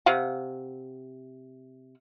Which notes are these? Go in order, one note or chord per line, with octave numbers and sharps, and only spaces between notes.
C3 F5 F#5